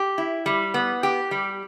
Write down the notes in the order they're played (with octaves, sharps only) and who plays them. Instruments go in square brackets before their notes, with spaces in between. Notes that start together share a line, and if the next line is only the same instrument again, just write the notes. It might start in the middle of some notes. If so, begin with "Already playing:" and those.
Already playing: [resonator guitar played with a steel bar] G4
E4
G3
B3
G4
G3